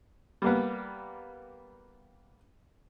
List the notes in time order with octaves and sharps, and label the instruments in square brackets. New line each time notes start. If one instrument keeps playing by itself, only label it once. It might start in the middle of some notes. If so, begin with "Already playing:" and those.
[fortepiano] G3 A#3 B3